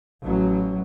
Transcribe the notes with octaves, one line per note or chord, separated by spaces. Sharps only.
A1 F#3